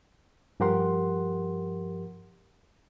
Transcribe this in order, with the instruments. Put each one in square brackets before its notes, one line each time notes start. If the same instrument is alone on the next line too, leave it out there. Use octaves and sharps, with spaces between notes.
[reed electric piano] G2 F3 G4 A#4 F#5 C6